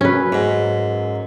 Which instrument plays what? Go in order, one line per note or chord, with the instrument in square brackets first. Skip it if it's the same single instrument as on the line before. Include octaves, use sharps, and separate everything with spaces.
[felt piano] F#2 F#3 [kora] C#4 B4
[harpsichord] G#2